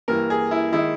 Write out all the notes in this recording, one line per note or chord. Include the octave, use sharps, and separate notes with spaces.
G2 E3 A#3 A#4
G#4
E4
D#3 G#3 E4